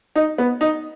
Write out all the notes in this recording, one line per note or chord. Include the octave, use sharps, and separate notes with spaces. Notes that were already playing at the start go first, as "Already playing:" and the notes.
D#4
B3
D#4